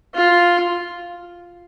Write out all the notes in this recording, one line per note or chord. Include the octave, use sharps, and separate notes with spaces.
F4